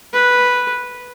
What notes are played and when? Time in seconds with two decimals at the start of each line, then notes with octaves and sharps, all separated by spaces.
0.13 B4